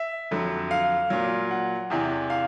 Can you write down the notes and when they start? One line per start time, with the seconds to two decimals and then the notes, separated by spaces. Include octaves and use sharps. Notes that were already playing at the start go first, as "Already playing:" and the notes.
Already playing: E5
0.31 F2 D3 F#3
0.71 F5
1.10 A#2 F#3
1.51 F#5
1.90 E2 C3 E3
2.30 F5